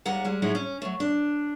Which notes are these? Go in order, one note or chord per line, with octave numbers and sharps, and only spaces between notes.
D#2 G3 G#3 F#5 A#5
G3 G#3
A2 F#3 G#3 D#4 E4 F#4
C#4
F#3 A3
D4